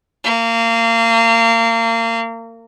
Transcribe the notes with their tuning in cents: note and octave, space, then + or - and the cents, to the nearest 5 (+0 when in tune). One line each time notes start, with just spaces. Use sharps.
A#3 -30